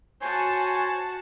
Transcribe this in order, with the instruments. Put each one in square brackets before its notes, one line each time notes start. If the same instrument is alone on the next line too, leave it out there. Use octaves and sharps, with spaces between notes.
[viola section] F#4 A5 [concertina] C5 C#5 [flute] G#5